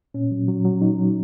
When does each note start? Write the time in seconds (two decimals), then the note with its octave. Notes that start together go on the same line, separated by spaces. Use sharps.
0.14 A#2 C#4
0.31 F#3
0.48 F#3
0.65 F#3
0.81 F#3 D#4
0.99 F#3